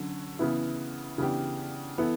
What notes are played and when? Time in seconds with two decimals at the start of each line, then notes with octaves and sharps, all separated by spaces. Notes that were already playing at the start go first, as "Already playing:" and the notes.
Already playing: D3 F#3 C#4
0.39 C#3 E3 B3 E4
1.18 C#3 E3 B3 D4 G4
1.98 E3 B3 E4 A4